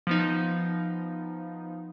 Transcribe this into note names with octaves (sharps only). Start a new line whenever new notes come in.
F3 B3 D#4